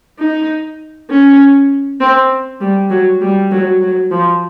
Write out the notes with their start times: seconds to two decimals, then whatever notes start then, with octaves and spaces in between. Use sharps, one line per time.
0.19 D#4
1.10 C#4
2.00 C4
2.61 G3
2.90 F#3
3.21 G3
3.51 F#3
3.81 F#3
4.11 F3